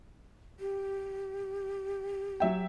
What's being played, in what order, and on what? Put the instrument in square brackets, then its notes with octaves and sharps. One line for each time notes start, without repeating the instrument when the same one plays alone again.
[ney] G4
[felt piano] F#3 E5 G5